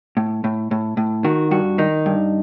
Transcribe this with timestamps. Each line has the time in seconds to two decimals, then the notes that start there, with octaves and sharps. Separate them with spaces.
0.17 A2
0.44 A2
0.71 A2
0.97 A2
1.24 D#3 F#4
1.51 G2 F#4
1.78 D#3 D#4
2.06 G2